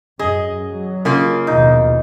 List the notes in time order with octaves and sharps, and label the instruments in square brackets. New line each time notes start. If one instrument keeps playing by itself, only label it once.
[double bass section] F#2 [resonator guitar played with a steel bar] G#4 [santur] D#5
[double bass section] F#3
[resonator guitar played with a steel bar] C#3 A#3 F4
[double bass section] A#1 D#2 B2 [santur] D#4